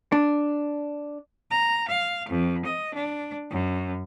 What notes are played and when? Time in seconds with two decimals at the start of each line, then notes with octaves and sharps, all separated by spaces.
0.12 D4
1.50 A#5
1.88 F5
2.28 F2
2.65 D#5
2.95 D4
3.50 F#2